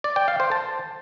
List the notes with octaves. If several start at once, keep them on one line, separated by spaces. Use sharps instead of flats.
D5
G5
F5
C5
A5